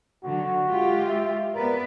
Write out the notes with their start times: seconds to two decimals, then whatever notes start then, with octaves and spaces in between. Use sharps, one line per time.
0.24 D3 F#3 F#4
0.66 G#3 F4 G4
1.08 E5
1.55 B3 A#4 B4 D5